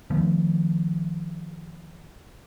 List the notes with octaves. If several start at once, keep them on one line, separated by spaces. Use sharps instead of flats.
D#3 F3 A3 B3